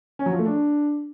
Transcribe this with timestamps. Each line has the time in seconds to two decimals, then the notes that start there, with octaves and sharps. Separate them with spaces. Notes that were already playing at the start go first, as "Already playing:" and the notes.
0.19 C#4
0.26 F#3
0.33 F3
0.39 A3
0.46 D4